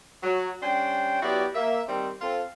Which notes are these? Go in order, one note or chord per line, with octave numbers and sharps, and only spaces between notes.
F#3
G3 C#4 D4 C5 G5
F#3 B3 E4 F#4 G4 D5
A#3 E5
D#3 G3 C4
C4 F4 A4